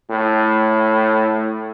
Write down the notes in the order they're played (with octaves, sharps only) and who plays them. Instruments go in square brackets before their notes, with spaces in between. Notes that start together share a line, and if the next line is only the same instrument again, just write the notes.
[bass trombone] A2